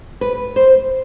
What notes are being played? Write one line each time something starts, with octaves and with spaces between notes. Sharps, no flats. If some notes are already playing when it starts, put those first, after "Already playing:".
B4
C5